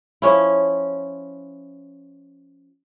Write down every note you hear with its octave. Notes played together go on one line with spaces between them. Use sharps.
F3 C#4 E4